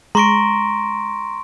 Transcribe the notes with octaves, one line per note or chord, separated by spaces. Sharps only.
G#3 A#5 C6 C#6 A#6 D7